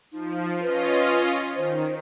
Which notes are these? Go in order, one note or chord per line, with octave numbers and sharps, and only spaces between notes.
F3 D#4
C#4 F4 B4 D#5
D#3 C5